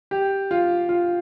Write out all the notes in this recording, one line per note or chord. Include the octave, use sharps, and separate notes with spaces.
G4
F4
F4